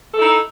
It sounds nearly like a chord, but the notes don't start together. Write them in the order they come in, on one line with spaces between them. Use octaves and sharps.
A4 E4 D#4